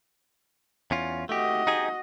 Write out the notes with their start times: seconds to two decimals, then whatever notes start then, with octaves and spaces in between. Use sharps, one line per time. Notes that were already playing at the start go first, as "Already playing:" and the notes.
0.91 E2 C#4 F4
1.29 A3 F#4 G4 D#5
1.67 D#4 G4 G#4